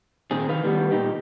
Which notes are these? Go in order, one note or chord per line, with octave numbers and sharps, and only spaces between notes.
A#2 D#3 C4 G#4
D#3 B4 F5
A2 D#3 G3 B3 B4
A#2 D#4 G4